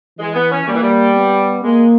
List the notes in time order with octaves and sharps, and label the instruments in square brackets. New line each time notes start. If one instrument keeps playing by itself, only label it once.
[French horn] E3 [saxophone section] G#3
[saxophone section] B3
C#4
[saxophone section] G3 [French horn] A#3
[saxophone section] E3
G3
[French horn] B3
[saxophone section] G#3 [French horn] A#3